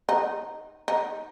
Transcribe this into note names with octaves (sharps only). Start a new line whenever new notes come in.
D#4
D#4